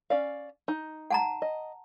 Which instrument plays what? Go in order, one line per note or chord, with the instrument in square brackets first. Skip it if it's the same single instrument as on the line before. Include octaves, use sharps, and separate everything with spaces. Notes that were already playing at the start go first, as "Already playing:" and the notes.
[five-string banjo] C#4 D5 F5
D#4
[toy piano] F#5 A5 A#5
[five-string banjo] D#5